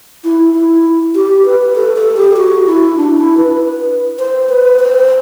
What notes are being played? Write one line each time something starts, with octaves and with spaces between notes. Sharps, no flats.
E4
E4
G4
B4
A4
A4
G4
F#4
E4
D4
E4
B4
C5
B4
C5